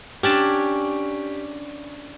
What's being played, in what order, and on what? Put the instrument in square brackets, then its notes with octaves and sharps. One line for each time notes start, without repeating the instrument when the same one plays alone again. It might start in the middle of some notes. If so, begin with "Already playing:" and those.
[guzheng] C#4 D4 A5 [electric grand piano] G4